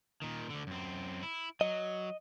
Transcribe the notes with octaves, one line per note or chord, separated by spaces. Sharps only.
A#2 D#3
D2 D3
F#2 C4
E4
F#3 D#5